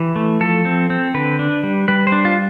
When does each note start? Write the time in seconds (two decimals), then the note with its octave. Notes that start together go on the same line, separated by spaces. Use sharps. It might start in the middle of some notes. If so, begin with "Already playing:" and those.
Already playing: E3 G4
0.16 A3
0.40 F3 A4
0.65 C4
0.90 C4
1.14 D3 B4
1.39 D4
1.63 G3
1.88 G3 B4
2.07 C5
2.12 D4
2.25 F4